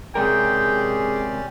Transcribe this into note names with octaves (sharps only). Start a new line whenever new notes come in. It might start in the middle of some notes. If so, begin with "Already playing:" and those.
C3 G#3 C#4 G4 G#4 A#4 D5 G5